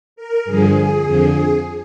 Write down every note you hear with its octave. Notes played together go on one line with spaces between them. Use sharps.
A#4
G2 D3 F3 G#4
F2 D3 F3